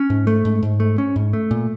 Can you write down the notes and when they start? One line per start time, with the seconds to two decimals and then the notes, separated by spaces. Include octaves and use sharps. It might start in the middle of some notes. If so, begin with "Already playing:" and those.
Already playing: C#4
0.10 G#2
0.27 A3
0.45 G#2
0.63 G#2
0.80 A3
0.98 C#4
1.16 G#2
1.33 A3
1.51 A#2